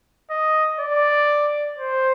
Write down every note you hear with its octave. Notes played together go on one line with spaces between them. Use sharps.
D#5
D5
C5